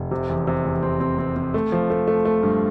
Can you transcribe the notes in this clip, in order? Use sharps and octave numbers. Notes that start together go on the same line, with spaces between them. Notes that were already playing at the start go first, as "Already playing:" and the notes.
Already playing: F1
C3
E2
C3
E2
C4
C4
C4
C4
A3
F3
A3
A3
A3
G2